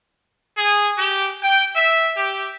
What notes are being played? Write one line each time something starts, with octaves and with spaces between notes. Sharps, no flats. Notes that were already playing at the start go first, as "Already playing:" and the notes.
G#4
G4
G5
E5
G4